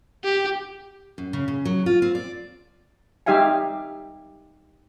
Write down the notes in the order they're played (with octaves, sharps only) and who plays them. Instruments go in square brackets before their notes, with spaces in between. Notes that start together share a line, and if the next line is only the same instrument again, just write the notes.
[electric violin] G4
[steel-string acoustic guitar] F#2
C#3
C#3
F#3
F4
C4
D5
[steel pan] G3 D#4 G4 E5 F5 G#5